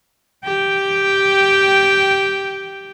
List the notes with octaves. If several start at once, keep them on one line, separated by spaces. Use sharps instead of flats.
G4 G5